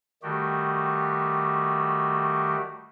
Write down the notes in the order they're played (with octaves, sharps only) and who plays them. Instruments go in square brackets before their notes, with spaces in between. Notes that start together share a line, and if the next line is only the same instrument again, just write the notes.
[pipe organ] D#3 G3 A3 F#4 G4